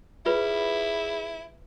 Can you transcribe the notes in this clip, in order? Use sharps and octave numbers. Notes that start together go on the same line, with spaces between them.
E4 F4 G#4 B4 C#5 B5